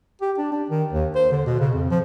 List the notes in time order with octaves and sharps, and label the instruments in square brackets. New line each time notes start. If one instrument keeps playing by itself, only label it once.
[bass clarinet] G4
D4
D4
D#3
D#2
C5
D3
B2
C#3
F2
F3